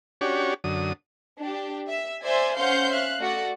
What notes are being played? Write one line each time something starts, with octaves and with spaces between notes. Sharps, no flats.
C#4 D4 F#4 G4 C#5
F#2 D3 D#6
D4 G4
E5
C5 D5 E5 G#5 C6
C#4 C5 F5 F#5 C6 G6
E5 F5 F#6
A3 F#4 D5 F#5